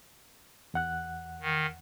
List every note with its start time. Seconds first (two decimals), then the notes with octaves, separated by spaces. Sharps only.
0.74 E2 F#5 F#6
1.41 D#3